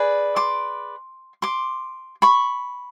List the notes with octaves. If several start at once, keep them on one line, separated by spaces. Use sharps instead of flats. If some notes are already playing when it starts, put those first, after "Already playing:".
Already playing: G#4 B4 D5
C6 D6
C6 D6
B5 C#6